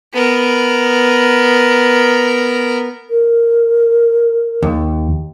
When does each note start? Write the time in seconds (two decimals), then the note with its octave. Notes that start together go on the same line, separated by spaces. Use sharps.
0.13 B3 A#4
3.10 A#4
4.63 D#2